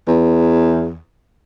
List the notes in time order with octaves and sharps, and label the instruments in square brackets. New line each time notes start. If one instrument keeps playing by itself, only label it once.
[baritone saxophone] E2